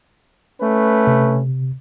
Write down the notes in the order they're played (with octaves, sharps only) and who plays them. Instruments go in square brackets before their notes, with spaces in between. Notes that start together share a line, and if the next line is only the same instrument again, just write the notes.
[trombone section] A3 C#4 B4
[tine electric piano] C3